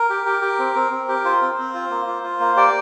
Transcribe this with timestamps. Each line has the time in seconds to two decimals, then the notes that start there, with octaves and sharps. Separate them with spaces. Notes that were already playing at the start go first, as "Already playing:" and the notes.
Already playing: A#4
0.10 G4
0.26 G4
0.42 G4
0.59 C4
0.75 C4
0.91 C4
1.09 G4
1.24 F4 C5
1.42 C4
1.58 C4
1.75 F4
1.90 A#3
2.07 F4
2.23 F4
2.40 A#3
2.57 G4 D5